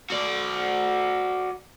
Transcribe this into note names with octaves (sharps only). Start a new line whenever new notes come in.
F#4 D5